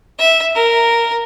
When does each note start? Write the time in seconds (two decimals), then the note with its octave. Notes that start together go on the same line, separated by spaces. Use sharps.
0.18 E5
0.55 A#4